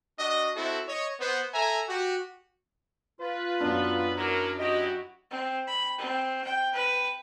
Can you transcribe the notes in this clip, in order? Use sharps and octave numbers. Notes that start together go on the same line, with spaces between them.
D4 F#4 D#5
C4 E4 F#4 A4
C#5 D#5
B3 C5
A4 E5 G#5 A#5
F#4 G4
F4 B4
F#2 B3 D4
F#3 E4 A#4 D5
E4 F#4 G4 D#5
C4
B5
C4
G5
B4